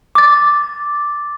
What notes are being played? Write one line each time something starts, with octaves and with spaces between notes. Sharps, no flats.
D6 A6